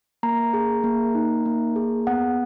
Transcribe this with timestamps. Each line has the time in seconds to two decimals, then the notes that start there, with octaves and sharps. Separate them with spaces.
0.23 A#3 A#5
0.54 G#4
0.84 A#3
1.15 D#4
1.46 A#3
1.76 G#4
2.07 B3 F#5